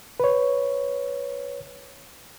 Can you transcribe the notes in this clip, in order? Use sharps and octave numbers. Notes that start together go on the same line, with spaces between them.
B4 C#5